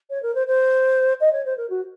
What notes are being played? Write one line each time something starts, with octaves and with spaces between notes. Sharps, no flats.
C#5
A#4
C5
C5
D#5
C#5
C5
A#4
F#4